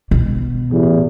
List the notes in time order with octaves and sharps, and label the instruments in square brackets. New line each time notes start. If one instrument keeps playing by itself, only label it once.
[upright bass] B2
[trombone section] A1 E2